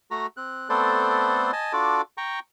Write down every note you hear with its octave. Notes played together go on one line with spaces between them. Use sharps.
A3 F#4 A#5
C4 F#6
A3 B3 C4 A4 C5 D5
D#5 G#5 A5
D4 F4 F#4 A4 D6
G5 A#5 C#6